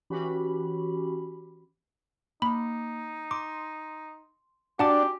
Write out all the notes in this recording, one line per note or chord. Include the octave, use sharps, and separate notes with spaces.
E3 C#4 F#4 G4 B5
A#3 D#4 B5
C6 D6
D4 F#4 G4 F#5 G#5 A5 D6